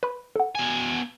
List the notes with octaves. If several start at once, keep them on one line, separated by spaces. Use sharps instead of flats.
B4 B5
A4 F#5
B2 G#5